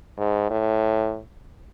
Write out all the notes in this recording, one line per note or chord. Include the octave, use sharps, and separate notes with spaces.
G#2
A2